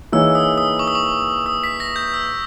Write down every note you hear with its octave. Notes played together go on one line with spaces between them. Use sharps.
E3 A#3 D#4 G#4 C#5 E6
D#6
D#6
C#6
D#6
C#6
D#6
B6
A#6
G6
E6